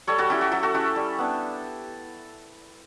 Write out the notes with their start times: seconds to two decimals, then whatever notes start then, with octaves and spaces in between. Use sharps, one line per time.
0.07 G3 A4 C#5
0.18 F#4 A4
0.30 C#4 E4 G4
0.41 F#4
0.52 F#3 G4
0.63 F#4 A4
0.74 C#4 E4 G4
0.96 G3
1.19 B3 D4